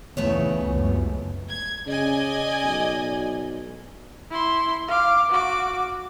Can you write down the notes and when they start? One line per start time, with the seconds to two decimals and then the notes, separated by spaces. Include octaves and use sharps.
0.17 B1 E2 C#3 A3 B3 C#5
0.65 F1 C#2 F#2
1.48 G#6
1.87 C#3 D5 D#5 G#5
2.64 B1
4.31 E4 C6
4.88 F5 D6
5.30 F#4 D6